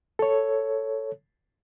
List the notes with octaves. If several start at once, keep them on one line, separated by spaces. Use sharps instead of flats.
A4 C#5